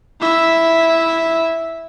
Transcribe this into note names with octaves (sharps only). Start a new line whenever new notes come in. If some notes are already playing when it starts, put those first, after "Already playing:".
E4 E5